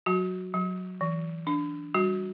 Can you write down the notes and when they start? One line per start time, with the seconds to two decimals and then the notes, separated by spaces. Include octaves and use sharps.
0.06 F#3 F#4
0.54 F#3
1.01 E3
1.47 D4
1.94 G3 F#4